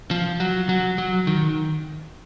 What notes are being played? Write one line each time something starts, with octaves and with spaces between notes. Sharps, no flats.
F3
F#3
F#3
F#3
D#3